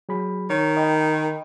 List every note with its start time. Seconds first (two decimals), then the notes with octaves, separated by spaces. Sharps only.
0.09 F#3 G#4 B5
0.50 D#3 C#5
0.77 D#5 G5 B5